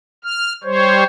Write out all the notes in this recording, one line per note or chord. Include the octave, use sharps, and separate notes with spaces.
F6
G3 C5 C#5